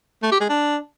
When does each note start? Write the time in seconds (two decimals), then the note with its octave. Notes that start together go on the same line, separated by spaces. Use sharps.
0.23 A3
0.32 G4
0.40 G#3
0.49 D4